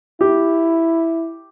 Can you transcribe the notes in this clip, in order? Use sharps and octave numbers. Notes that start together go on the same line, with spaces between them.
E4 G4